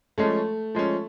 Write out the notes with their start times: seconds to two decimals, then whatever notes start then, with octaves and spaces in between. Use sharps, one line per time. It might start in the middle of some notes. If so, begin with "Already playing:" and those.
0.18 F3 G#3 A3 C#4
0.75 F3 G#3 C#4